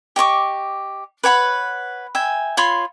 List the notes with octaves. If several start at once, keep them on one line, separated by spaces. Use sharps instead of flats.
G4 D#5 C#6 D6
B4 C#5 F#5 B5
E5 G5 G#5
F4 C#5 B5 C6